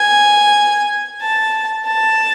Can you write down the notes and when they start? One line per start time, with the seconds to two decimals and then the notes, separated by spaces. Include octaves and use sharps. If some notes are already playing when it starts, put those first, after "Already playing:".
Already playing: G#5
1.22 A5
1.86 A5